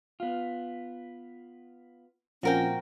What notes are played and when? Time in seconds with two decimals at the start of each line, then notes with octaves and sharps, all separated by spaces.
0.20 B3 F4
2.43 A#2 F3 C4 C#4 F#4 A#4 G5